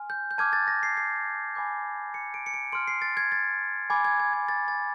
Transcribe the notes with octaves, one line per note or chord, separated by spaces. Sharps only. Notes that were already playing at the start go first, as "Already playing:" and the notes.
Already playing: G#5 C6 F6
G6
G6
A5 D6 F6 G#6
A6
A#6
C7
C7
G#5 B5 D6 G6
C#7
D7
C#7
D7
C6 F6 D7
C7
A6
G#6
A6
G#5 B5 D6 G#6
G#6
G#6
G#6
A6
A6